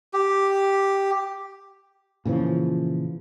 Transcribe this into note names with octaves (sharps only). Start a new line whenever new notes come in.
G4
A#2 C#3 E3 F3